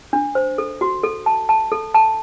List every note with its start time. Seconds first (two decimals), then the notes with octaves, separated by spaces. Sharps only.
0.13 D4
0.35 C5
0.58 A4
0.81 F#4
1.03 A4
1.26 A5
1.49 A5
1.72 A4
1.94 A5